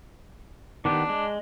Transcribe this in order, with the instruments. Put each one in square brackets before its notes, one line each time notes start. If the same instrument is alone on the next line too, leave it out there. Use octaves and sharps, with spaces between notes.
[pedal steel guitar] D#3 B3 G4 [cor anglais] D4
[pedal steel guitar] G#3